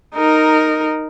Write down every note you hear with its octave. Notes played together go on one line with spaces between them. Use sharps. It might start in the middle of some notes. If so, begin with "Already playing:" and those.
D#4 A#4